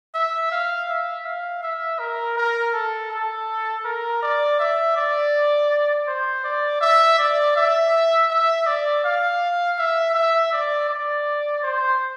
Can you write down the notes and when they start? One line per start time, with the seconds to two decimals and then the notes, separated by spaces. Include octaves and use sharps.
0.15 E5
0.52 F5
0.89 E5
1.25 F5
1.63 E5
1.99 A#4
2.37 A#4
2.74 A4
3.11 A4
3.85 A#4
4.23 D5
4.60 E5
4.96 D5
6.07 C5
6.44 D5
6.81 E5
7.19 D5
7.56 E5
8.30 E5
8.66 D5
9.05 F5
9.78 E5
10.15 E5
10.52 D5
10.90 D5
11.63 C5